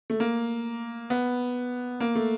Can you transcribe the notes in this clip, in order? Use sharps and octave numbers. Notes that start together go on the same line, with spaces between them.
A3
A#3
B3
A#3
A3